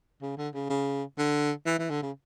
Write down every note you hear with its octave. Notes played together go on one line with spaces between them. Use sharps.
C#3
D3
C#3
C#3
D3
E3
E3
D3
C#3